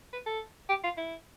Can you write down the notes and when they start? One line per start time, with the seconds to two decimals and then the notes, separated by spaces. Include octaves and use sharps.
0.13 B4
0.26 A4
0.69 G4
0.84 F4
0.98 E4